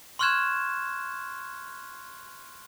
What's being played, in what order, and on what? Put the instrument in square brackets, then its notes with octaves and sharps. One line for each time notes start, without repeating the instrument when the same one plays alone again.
[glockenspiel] C6 C#6 F6 F#6 G#6 E7